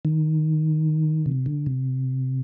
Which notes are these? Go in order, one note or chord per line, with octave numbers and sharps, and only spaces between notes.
D#3
C3
D3
C3